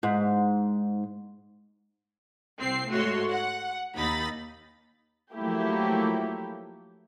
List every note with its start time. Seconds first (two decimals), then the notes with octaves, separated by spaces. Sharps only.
0.03 G#2
2.60 C2 C4 C7
2.92 G#2 A3 F#4 C#5 C6
3.29 F#5
3.94 D#2 D#4 B5 A6
5.35 F3 F#3 A3 A#3 E4 G4